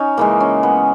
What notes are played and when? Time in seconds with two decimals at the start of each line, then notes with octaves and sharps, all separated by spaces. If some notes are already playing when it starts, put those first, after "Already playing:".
Already playing: C#4 D#4
0.17 C#3 E3 G#3 A#3
0.40 C#4
0.63 B3